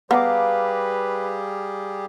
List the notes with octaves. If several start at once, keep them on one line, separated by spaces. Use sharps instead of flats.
G3 B3 G4 G#4 B4 F5 A#5 D6